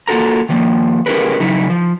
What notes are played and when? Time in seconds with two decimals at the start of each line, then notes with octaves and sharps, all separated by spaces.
0.07 A#3 F4 F#4 A4 A#5
0.49 D#3 F3 A#3
1.06 C#4 E4 G4 G#4 A#4 B4
1.40 C#3 F#3 D#4 E4
1.70 F3